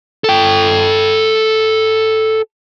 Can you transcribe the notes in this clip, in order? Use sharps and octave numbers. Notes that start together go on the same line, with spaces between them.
A4 G5